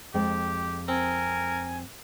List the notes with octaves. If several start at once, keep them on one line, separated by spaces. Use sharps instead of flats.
F2 G#3 G4 G5
C4 A#4 G#5